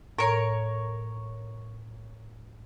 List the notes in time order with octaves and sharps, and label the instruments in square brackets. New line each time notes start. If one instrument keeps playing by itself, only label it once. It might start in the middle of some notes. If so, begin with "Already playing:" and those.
[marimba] A2 A#5 [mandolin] A#4 C#5